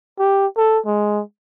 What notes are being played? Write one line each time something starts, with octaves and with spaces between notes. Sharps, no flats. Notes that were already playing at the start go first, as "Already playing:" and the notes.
G4
A4
G#3